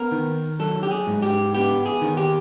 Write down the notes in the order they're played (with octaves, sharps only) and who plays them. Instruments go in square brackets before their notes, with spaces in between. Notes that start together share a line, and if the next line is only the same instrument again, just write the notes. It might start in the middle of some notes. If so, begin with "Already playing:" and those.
Already playing: [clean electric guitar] B3 A#4
D#3
F#3 A4
G4
G#4
G#2
G4
B3 G4
G#4
D#3
G4